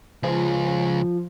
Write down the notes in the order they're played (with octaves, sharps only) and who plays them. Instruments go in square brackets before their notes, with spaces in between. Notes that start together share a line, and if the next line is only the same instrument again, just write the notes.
[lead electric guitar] C#2 G#4 [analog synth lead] F3